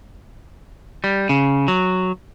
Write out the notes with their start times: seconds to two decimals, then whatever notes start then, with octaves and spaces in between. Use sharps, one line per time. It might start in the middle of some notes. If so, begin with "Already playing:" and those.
1.04 G3
1.29 C#3
1.68 F#3